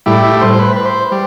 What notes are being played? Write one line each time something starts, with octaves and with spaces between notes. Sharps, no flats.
A2 G3 E4
E4
C5
C5
B4
B4
C5
G3